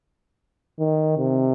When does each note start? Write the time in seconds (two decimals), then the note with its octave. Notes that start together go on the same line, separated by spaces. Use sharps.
0.79 D#3
1.18 C3